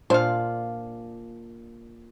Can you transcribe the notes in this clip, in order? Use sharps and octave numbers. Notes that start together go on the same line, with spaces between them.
A#2 D4 F4 C5 F5